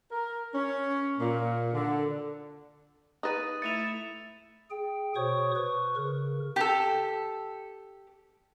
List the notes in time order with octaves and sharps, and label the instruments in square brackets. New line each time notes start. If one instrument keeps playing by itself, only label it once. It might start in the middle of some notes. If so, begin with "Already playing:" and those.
[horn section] A#4
C#4
A#2
D3
[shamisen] D#4 B4 [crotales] D#6 A6 D#7
[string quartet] A3 E4 [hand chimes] A6 [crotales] C#7 D#7 F7
[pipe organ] G#4 G5
B2 C5 C#5 C#6 D#6
B4 C#6
C#3 A#4
[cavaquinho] G4 A4